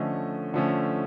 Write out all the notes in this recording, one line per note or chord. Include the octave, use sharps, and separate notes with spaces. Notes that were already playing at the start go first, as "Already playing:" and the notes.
Already playing: D3 F3 A3 C#4 D#5
D3 F3 A3 C#4